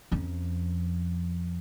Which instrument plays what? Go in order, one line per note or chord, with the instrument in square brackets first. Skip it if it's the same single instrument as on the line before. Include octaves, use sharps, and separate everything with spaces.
[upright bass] F2 C#4